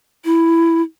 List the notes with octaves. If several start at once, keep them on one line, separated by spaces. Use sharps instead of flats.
E4